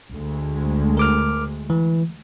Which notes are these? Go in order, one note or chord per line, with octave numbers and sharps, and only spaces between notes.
D2 G#3
A#4 D6 F6
E3